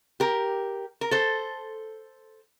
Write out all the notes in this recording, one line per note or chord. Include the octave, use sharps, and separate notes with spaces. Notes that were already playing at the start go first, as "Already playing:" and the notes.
G4 A#4
A#4
A4 C5